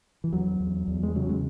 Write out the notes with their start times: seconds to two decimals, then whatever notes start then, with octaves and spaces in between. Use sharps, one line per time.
0.24 E3
0.33 E2 F#3
0.60 E2
0.87 E2
1.03 G#3
1.15 C#3 F#3
1.29 G#3